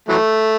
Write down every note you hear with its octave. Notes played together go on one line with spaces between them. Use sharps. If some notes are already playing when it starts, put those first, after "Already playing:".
E3 F#3 A3